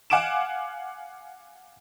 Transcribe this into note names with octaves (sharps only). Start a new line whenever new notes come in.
F5 F#5 G#5 D6 D7 E7